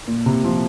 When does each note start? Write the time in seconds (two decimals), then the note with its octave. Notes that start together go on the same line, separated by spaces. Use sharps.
0.08 A#2
0.26 C3
0.45 F3